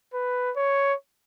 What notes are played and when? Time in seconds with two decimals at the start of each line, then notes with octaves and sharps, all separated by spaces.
0.14 B4
0.56 C#5